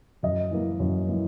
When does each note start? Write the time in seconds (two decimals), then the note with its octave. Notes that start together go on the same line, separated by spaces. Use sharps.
0.23 F#2 D#5
0.51 E3 A#3
0.80 F#2
1.08 E3 A#3